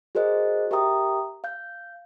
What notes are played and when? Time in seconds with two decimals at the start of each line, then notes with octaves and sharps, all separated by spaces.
0.15 F#4 G#4 A#4 C5 D#5
0.71 G4 A#4 E5 G5 A#5 D#6
1.44 F5 G6